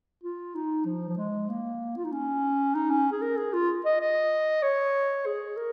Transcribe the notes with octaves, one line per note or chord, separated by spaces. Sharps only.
F4
D#4
F3
F3
G#3
A#3
F4
D#4
C#4
D#4
C#4
G#4
A#4
G#4
F4
D#5
D#5
C#5
G#4
A#4